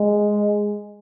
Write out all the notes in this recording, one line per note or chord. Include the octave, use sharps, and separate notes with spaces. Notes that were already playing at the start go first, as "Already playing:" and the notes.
Already playing: G#3